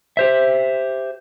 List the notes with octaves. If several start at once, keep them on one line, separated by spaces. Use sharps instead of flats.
G4 C5 E5